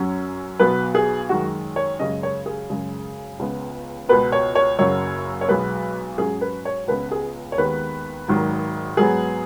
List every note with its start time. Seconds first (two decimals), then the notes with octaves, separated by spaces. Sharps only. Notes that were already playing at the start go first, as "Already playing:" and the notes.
Already playing: F#2 F#3 C#4
0.60 B1 B2 B3 B4
0.95 G#4
1.29 F#2 D#3 G#3 F#4
1.76 C#5
1.99 F#2 C#3 G#3 C#4 D#5
2.23 C#5
2.46 G#4
2.70 F#2 C#3 G#3
3.39 C#2 C#3 B3
4.09 C#2 B2 B3 B4
4.32 C#5
4.55 C#5
4.79 F#1 F#2 C#3 F#3 C#5
5.41 C#5
5.48 B1 B2 G#3 B3 B4
6.18 G#2 F#3 C#4 G#4
6.41 B4
6.65 C#5
6.88 C#2 C#3 B3 B4
7.11 G#4
7.52 C#5
7.57 D#2 D#3 G#3 B3 B4
8.28 G#1 G#2 D#3 F#3
8.97 G#2 F#3 B3 G#4